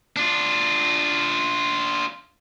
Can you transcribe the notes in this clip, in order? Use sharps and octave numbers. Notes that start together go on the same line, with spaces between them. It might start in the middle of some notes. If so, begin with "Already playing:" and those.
D4 F4